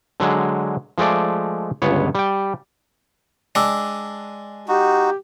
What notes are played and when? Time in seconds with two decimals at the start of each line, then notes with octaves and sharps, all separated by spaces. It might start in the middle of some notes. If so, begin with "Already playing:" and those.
0.20 D3 F#3 G#3
0.98 F3 G#3 A3 D5
1.82 G1 C#2 B3 C#5
2.15 G3 G5
3.55 G#3 D4 G5 D6 E6
4.68 D#4 F#4 G4